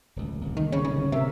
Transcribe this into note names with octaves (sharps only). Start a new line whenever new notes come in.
D1 C#2
D1 C2 A#3
D#3
C#3 C#5
C#3
C3 A#4 E5